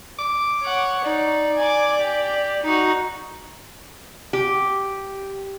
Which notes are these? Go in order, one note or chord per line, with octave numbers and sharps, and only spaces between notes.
D6
C#5 F#5
D#4 D5
G#5 D6
G4
D#4 F#4
G4